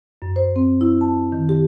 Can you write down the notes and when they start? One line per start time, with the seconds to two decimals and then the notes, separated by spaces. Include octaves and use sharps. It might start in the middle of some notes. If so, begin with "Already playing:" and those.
0.22 F#2
0.36 C5
0.56 C4
0.81 E4
1.01 A5
1.32 D#3
1.49 G4